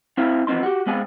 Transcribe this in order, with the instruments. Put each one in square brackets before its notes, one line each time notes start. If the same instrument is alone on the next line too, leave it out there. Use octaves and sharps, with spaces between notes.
[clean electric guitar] C4 E4 C5 E5 F5
E3 F3 B3 C4 D#4 C6
F#4 G4
G#3 B3 C4 G#4 F5 G#5